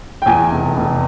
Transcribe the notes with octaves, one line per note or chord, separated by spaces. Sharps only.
G5
E2 G#5
F1
F1